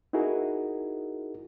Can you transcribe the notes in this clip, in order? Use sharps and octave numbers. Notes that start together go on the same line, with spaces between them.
D#4 E4 F#4 G#4 A#4